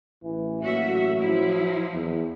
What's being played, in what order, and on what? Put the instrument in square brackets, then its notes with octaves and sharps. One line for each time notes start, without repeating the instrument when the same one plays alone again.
[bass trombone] A1 [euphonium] E3
[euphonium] F#3 [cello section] A#3 F#4 E5
[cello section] F3 E4
[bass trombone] E2